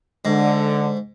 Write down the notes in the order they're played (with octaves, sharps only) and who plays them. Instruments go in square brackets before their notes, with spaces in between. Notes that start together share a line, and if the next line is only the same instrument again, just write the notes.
[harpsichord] G#2 [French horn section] D3